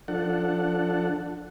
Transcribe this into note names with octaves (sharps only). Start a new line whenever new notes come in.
F3 D4 A4 F#5